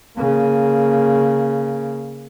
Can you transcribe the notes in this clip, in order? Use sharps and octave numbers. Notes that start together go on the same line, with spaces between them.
C#3 A#3